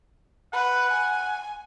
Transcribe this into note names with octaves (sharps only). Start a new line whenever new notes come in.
B4 F#5
G#5